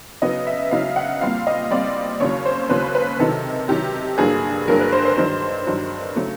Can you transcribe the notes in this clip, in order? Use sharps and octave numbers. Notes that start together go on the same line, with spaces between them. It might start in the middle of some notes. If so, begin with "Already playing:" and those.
C#3 F#3 B3 D#4 D#5
E5
C#3 F#3 B3 D#4 F5
F#5
A#2 G3 C4 F5
D#5
A#2 G3 C4 D5
D#2 C#3 F#3 C#5
C5
D#2 C#3 F#3 B4
B4
C3 D#3 F#3 A4
C3 D#3 F#3 G4
G2 D3 F#3 A#3 G#4
G2 D3 F#3 A#3 A#4
B4
C5
C5
G2 D#3 F#3 C5
G2 D#3 F#3
C#3 F#3 A3